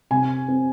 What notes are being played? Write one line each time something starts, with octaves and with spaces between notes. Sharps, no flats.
C3 G#5
C4